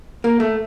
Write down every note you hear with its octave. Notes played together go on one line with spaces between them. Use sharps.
A#3
A3